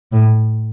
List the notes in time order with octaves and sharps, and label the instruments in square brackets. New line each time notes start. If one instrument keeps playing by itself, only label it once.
[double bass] A2